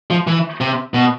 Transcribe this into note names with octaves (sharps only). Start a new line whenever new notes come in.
F3
E3
C3
B2